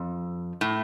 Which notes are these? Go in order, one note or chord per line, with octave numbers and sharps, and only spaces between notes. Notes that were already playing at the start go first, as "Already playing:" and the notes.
Already playing: F2
A2